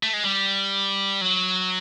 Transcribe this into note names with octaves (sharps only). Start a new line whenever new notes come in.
A3
G#3
G3
F#3